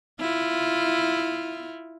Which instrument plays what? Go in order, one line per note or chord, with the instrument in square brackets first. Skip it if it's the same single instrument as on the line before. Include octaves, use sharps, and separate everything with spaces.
[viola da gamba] E4 F4